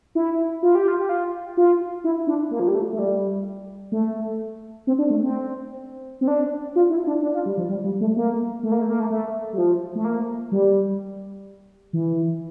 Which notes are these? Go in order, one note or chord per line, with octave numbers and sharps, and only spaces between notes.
E4
F4
G4
F4
G4
F4
F4
E4
D4
A#3
F3
G3
A3
A3
G3
A3
C4
D4
A3
C4
C4
D4
F4
E4
D4
D4
F4
G3
F3
G3
G3
A3
A#3
A3
A#3
A3
A#3
A3
A3
G3
F3
A3
A#3
G3
E3